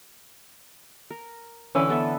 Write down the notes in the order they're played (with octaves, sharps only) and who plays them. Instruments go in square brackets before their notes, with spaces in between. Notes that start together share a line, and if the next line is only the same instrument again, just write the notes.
[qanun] A#4
[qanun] D3 [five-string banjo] E3 C#4
[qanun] B3 A4 E5